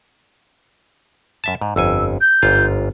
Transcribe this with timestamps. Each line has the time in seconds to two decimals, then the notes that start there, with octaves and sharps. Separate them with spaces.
1.44 F#2 E5 A5
1.62 G#2
1.76 G1 F2 G#5 E6
2.21 G6
2.43 G1 G#2 F4